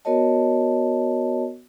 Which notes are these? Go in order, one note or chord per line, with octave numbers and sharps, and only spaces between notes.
B3 F#4 A#4 C#5 D#5 A5